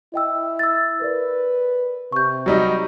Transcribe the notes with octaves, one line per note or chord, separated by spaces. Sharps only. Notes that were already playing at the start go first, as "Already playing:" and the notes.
E4 D#5 G5 E6
E6 A6
A#4 B4 D5
C3 C#6 G6
F#3 G3 D#4